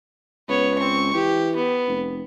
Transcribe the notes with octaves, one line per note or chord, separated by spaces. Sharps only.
C#2 B3 C#5
C4 C#6
E3 G4
B3
F1